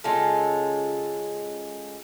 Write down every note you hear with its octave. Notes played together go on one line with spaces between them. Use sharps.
C#3 G#3 F4 A4